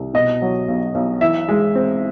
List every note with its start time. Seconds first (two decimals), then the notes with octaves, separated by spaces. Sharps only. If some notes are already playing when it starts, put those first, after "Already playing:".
Already playing: C2
0.14 B2 D#5
0.42 F#3
0.68 B1
0.95 B1
1.21 E3 E5
1.48 G#3
1.75 C4